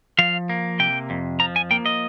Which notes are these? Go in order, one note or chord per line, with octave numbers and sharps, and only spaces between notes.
F3 F5
A#3
C3 G5
F2
F3 A#5
G#5
A#3 G5
D#5